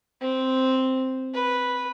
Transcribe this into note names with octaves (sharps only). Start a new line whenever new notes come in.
C4
B4